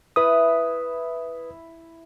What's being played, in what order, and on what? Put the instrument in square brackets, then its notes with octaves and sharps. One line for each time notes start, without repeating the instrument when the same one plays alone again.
[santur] E4 E5 [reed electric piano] B4 D#6